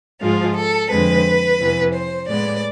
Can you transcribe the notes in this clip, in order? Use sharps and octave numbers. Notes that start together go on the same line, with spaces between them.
G#2 F3 G#3 F4
A4
F2 D3 G#3 C4 B4
F2 C3 E3 B3
C5
A2 G#3 B3 D5